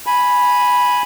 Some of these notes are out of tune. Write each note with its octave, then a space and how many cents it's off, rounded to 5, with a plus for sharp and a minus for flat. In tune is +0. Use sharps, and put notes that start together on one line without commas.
G#5 +0 B5 -5